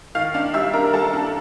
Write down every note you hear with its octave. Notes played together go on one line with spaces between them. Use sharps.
D#3 F5 F6
D4 F5 F6
G3 E5 E6
D4 A#4 A#5
G3 A4 A5
D4